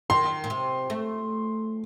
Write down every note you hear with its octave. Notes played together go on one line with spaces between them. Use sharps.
D#3 C6
A#2
C3
A3